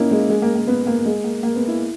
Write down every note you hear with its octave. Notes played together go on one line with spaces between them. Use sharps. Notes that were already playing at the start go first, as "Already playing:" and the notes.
Already playing: A#3 C#4 D#4 E4
G#3
G#3
A#3
A#3
B3
A#3
G#3
A#3
A#3
B3
E4